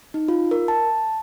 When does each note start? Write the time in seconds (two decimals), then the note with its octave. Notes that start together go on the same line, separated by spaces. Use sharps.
0.14 D#4
0.28 F4
0.51 A#4
0.68 A5